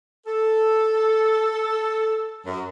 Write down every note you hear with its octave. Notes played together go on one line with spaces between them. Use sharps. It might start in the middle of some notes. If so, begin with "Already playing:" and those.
A4
F#2